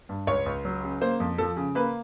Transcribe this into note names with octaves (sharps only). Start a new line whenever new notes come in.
G2
C#2 C#5
C#2
F#3
C#3
A#3 C5
F2
F3 A4
C#3
A#3 B4